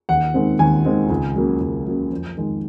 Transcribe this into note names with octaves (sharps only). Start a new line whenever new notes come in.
D#2 F#5
D#3 G#3 C4
D#2 G#5
D#3 G#3 C4
C#2
C#3 F#3 A#3
C#2
C#3 F#3 A#3
F2
D#3 G#3